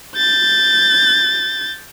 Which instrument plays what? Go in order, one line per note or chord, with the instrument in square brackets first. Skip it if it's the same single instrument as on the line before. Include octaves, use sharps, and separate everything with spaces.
[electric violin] G6 A6